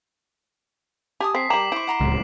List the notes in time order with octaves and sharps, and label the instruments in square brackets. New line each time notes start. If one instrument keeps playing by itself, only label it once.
[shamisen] G4 [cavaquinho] G#5 A5 D#6
[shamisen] C4 [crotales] B6 C7
[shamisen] G3 A#4 A#5 [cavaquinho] G5 [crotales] D6 E7 F#7
[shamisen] E4 [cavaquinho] C5 C#6 [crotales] D7
[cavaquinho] F#5 A#5 C6
[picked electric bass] D1 C#2